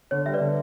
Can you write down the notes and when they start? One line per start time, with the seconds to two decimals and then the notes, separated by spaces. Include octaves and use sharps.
0.11 D3 C#5
0.26 G3 E5
0.33 B4 D5
0.40 D3